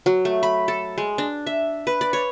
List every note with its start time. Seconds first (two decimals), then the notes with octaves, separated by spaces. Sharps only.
0.06 F#3
0.25 A3
0.43 B5
0.68 A4
0.98 G#3
1.18 D4
1.47 E5
1.87 B4
2.01 D5
2.13 C#5